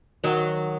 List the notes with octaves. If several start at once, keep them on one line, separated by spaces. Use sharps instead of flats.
D#3 F#3